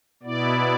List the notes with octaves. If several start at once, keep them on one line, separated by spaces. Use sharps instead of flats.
B2 B3 E4 D5